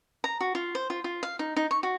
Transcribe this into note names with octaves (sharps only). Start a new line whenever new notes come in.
A#5
F#4
F4
C5
F4
F4
F5
D#4
D#4
C#6
F#4